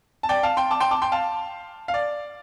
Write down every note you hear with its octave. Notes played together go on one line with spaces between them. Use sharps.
A5
D5 G5
F5 A5
G5 C6
A5 D6
G5 C6
A5 D6
G5 C6
F5 A5
F5
D5